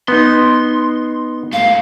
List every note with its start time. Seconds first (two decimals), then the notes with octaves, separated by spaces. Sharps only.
0.08 B3 D#4 C6
1.52 G#2 A3 F5